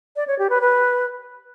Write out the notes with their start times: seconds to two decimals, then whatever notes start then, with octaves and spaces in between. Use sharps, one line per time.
0.16 D5
0.27 C#5
0.39 G4
0.50 B4
0.61 B4